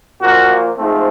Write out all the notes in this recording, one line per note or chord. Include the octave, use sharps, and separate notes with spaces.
A#2 F3 A#3 F#4
G#2 F3 A3 C4